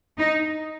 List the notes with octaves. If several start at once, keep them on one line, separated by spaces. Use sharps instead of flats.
D#4